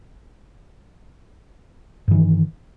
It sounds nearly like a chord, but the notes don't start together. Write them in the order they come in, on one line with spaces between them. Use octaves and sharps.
G2 E3 D#3